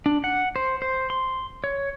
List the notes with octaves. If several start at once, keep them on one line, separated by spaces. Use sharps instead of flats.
D4
F#5
C5
C5
C6
C#5